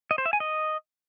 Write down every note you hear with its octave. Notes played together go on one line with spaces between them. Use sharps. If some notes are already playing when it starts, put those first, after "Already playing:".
D#5
C5
E5
G#5
D#5